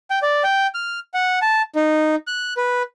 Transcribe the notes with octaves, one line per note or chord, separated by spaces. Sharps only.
G5
D5
G5
F6
F#5
A5
D#4
F#6
B4